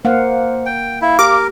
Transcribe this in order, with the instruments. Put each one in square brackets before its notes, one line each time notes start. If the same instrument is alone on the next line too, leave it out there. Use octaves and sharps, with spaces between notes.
[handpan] A#3 F5 F#5 [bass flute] C5
[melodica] G5
[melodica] E4 [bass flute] F5
[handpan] G4 [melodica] A#4 [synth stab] D6